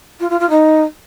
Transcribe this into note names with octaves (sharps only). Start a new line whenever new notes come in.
F4
F4
F4
D#4